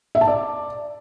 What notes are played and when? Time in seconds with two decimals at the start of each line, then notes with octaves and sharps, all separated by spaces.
0.15 E5
0.21 A5
0.28 D5